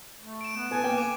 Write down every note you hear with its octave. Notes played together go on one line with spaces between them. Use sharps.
A3
D7 E7
B3
B3 A4 G#5
A#3 B4 G5
D6